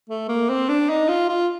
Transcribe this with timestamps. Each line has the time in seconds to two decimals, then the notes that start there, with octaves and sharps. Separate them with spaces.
0.09 A3
0.29 A#3
0.50 C4
0.69 D4
0.90 D#4
1.09 F4
1.29 F4